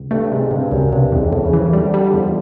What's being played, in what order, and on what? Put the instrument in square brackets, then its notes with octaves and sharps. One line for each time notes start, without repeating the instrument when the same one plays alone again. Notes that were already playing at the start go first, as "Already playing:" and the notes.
Already playing: [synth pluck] C#2
[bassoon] G2 [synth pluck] A3
[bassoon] G#2 [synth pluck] C3
[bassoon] G2 [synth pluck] C3
[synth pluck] C#2 [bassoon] F#2
[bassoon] G2 [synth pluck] C3
[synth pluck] E2 [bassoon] G#2
[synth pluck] E2 [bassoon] A2
[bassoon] C#3
[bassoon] C3 [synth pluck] E3
[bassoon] D3 [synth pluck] G3
[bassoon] D3
[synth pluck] G3
[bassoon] D3
[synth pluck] E2
[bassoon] F3